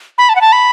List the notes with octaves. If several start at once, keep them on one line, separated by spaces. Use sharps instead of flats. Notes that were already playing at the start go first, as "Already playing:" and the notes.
B5
A5
F#5
A5
B5